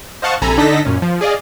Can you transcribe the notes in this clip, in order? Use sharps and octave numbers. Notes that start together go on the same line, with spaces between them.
C5 D#5 F5 F#5 A5 C#6
A#1 C3 A4 G#5 A#5 B5
D3 D4 D#4 A4 A#6 B6
F#2 A#2 C#4
F3
G#4 D5 D#5 F5